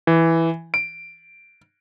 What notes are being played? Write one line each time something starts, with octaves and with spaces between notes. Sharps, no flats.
E3
D7